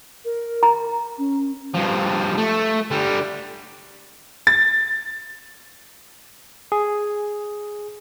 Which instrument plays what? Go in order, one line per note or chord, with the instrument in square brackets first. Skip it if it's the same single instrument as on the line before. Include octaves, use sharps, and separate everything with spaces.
[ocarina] A#4
[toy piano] A#5
[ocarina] C#4
[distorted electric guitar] G2 F3
A3
D3 G3
[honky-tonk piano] A6
[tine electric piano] G#4